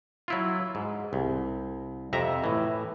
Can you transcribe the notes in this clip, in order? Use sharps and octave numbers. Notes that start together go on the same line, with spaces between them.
F#3 E4 F4
G#2
C2
F2 C3 E5 A#5
A2 E3